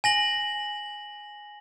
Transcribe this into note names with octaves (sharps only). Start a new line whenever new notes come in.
G#5 A#6 F#7